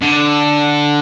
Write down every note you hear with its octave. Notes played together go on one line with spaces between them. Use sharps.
D3